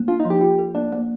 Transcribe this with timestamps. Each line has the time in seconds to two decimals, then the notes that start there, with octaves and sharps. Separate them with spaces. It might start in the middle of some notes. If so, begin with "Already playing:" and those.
Already playing: A#3
0.08 D4 F4
0.20 D#4
0.25 F3
0.30 G4
0.41 F4
0.59 A4
0.75 A#3 D4
0.92 A#3